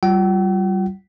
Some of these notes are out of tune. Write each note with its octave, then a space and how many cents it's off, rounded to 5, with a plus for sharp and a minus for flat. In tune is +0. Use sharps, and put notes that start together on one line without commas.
G3 -30 F4 +0 F#5 +45